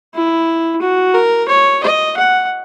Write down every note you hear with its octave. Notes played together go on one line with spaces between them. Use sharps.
E4
F#4
A#4
C#5
D#5
F#5